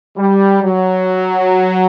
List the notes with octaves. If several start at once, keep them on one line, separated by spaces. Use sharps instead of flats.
G3
F#3